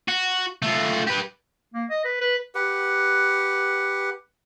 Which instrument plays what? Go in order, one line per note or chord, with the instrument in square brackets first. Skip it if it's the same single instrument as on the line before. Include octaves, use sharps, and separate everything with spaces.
[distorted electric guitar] F#4
A3 F4
G4 B4
[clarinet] A#3
D#5
B4
B4
[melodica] G4 B4 F#5